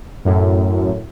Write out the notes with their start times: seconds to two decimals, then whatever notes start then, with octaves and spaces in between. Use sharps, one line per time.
0.25 F#2 A2